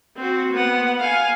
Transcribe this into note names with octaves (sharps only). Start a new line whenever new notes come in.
C4 F#4
B3 F#5
F5 G#5